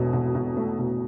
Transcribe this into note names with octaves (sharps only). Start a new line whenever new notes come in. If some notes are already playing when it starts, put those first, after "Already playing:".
Already playing: E1 E2 B2 A3
B2
B2
A3
B2